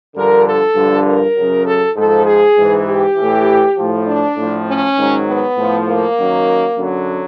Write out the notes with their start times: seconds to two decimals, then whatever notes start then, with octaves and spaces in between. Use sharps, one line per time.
0.16 G2 D3 F3 A#4
0.45 A4
0.76 G2 D3 F3
1.06 A#4
1.36 F#2 C#3 F#3
1.66 A4
1.96 G#2 F3 A4
2.26 G#4
2.57 G#2 E3
2.87 G4
3.16 A2 E3
3.77 A2 F3
4.06 D4
4.37 A2 F3
4.66 C#4
4.97 G#2 D#3 F#3
5.26 B3
5.57 A2 F3
5.86 A#3
6.16 F#2 D#3 F#3
6.77 F#2 D3 F#3